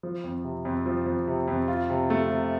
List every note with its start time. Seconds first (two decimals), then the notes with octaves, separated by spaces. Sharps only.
0.03 F3
0.24 F2
0.44 C3
0.65 F2
0.86 F3
1.06 F2
1.28 C3
1.48 F2
1.68 F4
1.90 C3
2.10 A3
2.30 C3